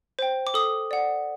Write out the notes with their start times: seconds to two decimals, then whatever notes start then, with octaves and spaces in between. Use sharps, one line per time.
0.19 C5 G5
0.47 D6
0.54 A4 D#6
0.91 D5 F#5